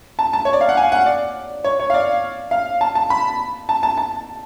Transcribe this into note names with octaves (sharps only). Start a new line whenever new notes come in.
A5
A5
C#5
D5
F5
F#5
G#5
F#5
D5
C#5
C#5
F5
D5
F5
A5
A5
B5
A5
A5
A5